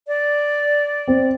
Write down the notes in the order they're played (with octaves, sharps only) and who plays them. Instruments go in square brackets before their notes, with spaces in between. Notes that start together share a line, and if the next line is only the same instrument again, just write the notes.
[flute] D5
[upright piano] C4